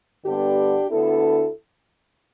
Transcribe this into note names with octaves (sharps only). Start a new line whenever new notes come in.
G2 D3 G3 B3 D4 G4
D2 D3 B3 E4 A4